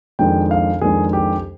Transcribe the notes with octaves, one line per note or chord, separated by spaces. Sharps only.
F2 D#3 G#3 D4 G5
F5
F2 D#3 G#3 D4 G#4
G4